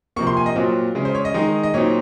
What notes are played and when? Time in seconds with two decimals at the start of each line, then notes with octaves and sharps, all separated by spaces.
0.16 C3 F3 A#3 C#6
0.27 C6
0.37 G#5
0.46 D#5
0.55 A#2 F#3 C4 F4
0.95 C#3 G#3 C#4
1.05 C5
1.15 C#5
1.25 D#5
1.34 D#3 G#3 D#4
1.63 D#5
1.74 A#2 F#3 C4 D#4 C#5